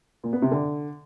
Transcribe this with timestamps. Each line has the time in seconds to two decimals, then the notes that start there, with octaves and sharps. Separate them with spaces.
0.24 A#2
0.33 B3
0.42 C3
0.52 D3